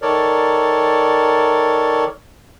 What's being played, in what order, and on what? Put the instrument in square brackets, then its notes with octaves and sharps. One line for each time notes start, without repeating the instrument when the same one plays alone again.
[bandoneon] D#3 A4 A#4 C#5 D5